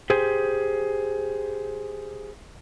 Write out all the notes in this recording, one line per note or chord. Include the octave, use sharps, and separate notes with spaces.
G4 G#4 C5